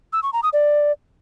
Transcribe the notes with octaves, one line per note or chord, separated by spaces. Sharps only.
E6
C#6
A#5
D#6
D5